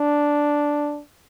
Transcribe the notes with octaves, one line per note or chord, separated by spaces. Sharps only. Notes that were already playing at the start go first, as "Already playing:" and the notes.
Already playing: D4